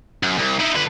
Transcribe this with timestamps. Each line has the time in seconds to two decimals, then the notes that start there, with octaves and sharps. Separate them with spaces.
0.23 F#2
0.38 C2
0.59 D#4 E4
0.75 D3 B4